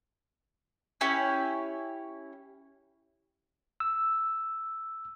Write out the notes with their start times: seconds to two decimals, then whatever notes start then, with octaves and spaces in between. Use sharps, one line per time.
1.01 C#4 E4 G4 C#5
3.80 E6